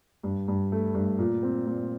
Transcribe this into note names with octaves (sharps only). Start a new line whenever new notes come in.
G2
G2
A3
G2
A#2
C4
A#2